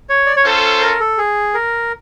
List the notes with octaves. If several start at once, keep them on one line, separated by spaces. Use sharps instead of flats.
C#5
D5
C#5
C#4 F4 A4 C5
A#4
A4
G#4
A#4